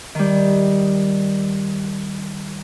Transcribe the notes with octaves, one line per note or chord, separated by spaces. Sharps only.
D#3 G3